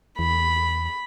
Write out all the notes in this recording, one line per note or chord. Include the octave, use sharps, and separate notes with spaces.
E2 B5